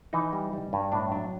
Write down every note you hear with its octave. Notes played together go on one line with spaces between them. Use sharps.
E3 D#4
G3
G3
G2
A2 D4
F#3 D4